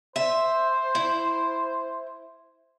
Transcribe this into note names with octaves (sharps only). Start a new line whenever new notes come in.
C5 E5
E4